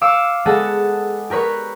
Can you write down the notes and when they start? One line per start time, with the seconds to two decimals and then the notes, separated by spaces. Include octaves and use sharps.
0.01 F5 D6 E6 C#7
0.45 G#3 B3 G#4 A4 F#5 A5
1.30 G4 A#4 B4 C#5